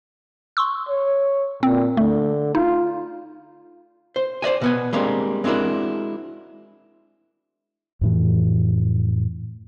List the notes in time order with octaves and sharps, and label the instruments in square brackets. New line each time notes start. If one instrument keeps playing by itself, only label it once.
[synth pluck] C6 C#6 E6
[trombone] C#5
[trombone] A#2 [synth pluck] C4
[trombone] D3 [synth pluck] A3
[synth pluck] D#4 [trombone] F4
[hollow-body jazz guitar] C5
C5 D5 D#5 G#5
B2 B3 G#5
G3 G#3 A#3 C4 D4
G#3 C4 D4 E4 F#4 A#4
[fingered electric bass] F2 A2 E3